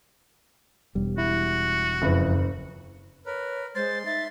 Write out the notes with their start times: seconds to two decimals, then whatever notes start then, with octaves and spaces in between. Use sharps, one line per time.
0.95 E1 G3
1.18 E4 F#4
2.02 F#1 F2 E4 B4
3.26 A#4 B4 C#5
3.75 G#3 C5 C6 A6
4.06 D#4 E5 A6